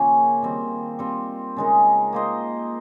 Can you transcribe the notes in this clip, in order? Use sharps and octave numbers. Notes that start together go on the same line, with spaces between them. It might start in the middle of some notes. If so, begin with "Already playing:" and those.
Already playing: C#3 F3 A#3 C#4 F4
D#3 G3 C4
G3 C4 F4
C#3 G#3 D#4 A#4
A#3 F4 C5 D#5